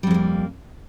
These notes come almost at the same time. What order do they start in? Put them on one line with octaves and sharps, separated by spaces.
G3 F2 G#3 A#3